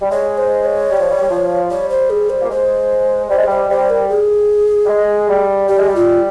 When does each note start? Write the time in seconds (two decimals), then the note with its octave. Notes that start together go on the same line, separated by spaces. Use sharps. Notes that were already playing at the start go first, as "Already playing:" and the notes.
0.02 G3
0.11 G#3 C#5
0.38 C5
0.65 C#5
0.91 G3
1.00 F3
1.10 G3
1.21 G3
1.30 F3
1.71 G3 C#5
1.90 C5
2.10 G#4
2.30 C5
2.42 A#3
2.50 G#3 C5
3.30 G3 C5
3.38 G#3
3.47 G3 C5
3.70 G3 C5
3.90 A#4
4.10 G#4
4.85 G3
4.89 G#3
5.29 G3
5.69 G3 G4
5.79 G#3
5.88 G3
5.96 F4